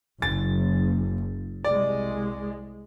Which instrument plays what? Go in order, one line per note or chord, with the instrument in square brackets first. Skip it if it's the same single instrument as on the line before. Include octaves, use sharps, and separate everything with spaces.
[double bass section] F#1 [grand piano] A6
[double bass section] C2 G#3 [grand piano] D5